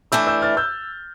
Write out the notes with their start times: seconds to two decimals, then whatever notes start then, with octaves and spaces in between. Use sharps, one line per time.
0.12 E3 A3 D4 E6 G6
0.27 E6 G6
0.42 F6 A6
0.57 E6 G6